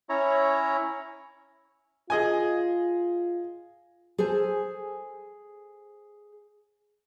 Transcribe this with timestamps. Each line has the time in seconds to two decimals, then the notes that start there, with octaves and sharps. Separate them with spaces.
0.09 C#4 E4 C#5 A#5
2.10 F4 G#4 D#5 G#5
4.18 G#4 A4 C5 G#5